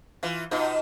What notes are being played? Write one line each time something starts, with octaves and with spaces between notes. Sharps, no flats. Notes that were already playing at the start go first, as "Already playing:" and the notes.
E3 F4
B2 D#4 F4